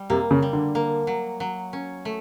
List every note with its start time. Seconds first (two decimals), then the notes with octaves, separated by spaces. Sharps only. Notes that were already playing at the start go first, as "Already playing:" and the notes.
Already playing: G3
0.10 C3 A#3
0.31 C#3
0.43 G3
0.53 D3
0.75 A#3
1.07 F#3
1.40 F#3
1.73 C#4
2.05 A3